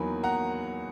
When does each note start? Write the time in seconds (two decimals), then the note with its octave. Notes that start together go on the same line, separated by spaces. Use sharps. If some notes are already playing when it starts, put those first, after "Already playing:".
Already playing: E2 D#3 F#3 A#3 G#5 B5
0.23 F#5 A#5